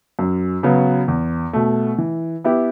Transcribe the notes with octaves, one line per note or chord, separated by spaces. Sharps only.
F#2
C#3 F#3 B3
E2
B2 A3
E3
B3 E4 G4